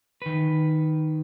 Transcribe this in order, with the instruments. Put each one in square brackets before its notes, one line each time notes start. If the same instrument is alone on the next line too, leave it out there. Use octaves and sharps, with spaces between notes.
[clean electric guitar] D#3 B4